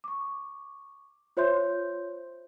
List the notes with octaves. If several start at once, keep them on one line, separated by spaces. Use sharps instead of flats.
C#6 D6
F4 C5 C#5 E5 C6 G6